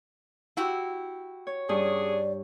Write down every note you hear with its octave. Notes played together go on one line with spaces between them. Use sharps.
E4 F#4 G4
C#5
G2 C#4 D4 G#4 D5